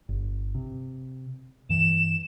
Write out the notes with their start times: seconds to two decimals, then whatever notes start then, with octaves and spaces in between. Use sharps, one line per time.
0.09 G1
0.55 C3
1.69 G2 E3 E7